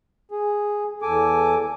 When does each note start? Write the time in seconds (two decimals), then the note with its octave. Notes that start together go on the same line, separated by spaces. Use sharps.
0.31 G#4
1.02 E2 A4 G#5 D6